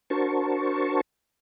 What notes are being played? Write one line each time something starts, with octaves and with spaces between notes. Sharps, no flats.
D4 F#4 A#4 C5 A5 C#6